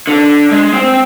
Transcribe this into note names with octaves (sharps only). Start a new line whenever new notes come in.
D3 D4
G#3
C4 G5